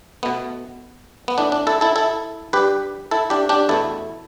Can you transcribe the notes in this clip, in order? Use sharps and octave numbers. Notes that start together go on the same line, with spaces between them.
B2 A3 B3
B3
A2 E3 A3 D4
D4
E4 A4
E4 A4
E4 A4
G2 G3 G4 B4
E4 A4
D4 G4
D4 G4
E2 B2 A3 E4 A4